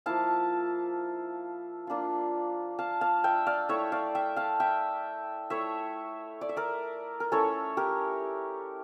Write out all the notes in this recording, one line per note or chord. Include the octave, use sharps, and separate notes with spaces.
F3 A#3 E4 F5 A5
A#3 D4 F4
F5 A5
F5 A5
E5 G5
D5 F5
A3 E4 C#5 E5
D5 F5
E5 G5
F5 A5
E5 G5
A3 E4 C#5 E5
D5
E5
A#4 D5
A#4
A3 C#4 E4 A4 C#5
G4 A#4